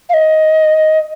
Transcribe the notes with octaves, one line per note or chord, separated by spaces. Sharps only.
F5
D#5